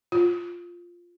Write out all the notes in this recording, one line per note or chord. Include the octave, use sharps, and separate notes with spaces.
F4